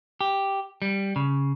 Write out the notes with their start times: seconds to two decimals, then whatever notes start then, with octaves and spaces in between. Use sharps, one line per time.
0.21 G4
0.82 G3
1.16 C#3